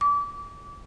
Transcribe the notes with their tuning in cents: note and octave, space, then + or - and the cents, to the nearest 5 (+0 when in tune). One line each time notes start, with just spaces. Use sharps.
D6 -30